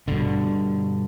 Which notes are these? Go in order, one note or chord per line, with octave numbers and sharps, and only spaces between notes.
G2 B2 D3